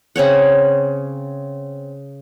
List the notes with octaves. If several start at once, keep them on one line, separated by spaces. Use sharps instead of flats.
C#3 C4 C#5 F#5